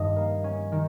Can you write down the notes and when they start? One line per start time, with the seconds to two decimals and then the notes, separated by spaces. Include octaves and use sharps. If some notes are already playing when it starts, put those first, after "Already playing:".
Already playing: G2 D#3 G3 D#5
0.16 A#3
0.44 C#4
0.72 D#3